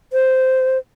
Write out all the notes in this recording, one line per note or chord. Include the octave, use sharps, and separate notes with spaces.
C5